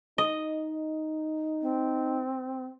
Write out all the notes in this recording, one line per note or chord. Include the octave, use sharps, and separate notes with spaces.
D#4 D#5
C4